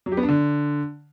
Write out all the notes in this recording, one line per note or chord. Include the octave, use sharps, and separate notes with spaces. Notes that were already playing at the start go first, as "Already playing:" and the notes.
F#3
G4
B3
D4
D3